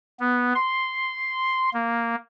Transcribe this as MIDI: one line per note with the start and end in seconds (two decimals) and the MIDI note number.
0.20 0.53 59
0.55 1.69 84
1.74 2.15 58